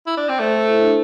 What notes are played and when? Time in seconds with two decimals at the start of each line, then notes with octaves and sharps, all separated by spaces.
0.07 E4
0.17 D4
0.29 C4
0.40 A3 C5
0.55 A4
0.68 E4
0.81 D4